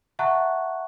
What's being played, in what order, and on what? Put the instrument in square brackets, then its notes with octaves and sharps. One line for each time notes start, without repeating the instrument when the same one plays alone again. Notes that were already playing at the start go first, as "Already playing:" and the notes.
[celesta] E5 F#5 A5 A#5 C#6 F#6